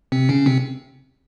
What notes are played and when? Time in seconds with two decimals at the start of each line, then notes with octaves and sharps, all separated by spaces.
0.12 C3 C4
0.29 C#3 C#4
0.46 C3 C4